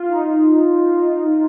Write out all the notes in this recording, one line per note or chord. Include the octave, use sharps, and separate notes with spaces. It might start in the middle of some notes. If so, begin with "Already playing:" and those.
Already playing: F4
D#4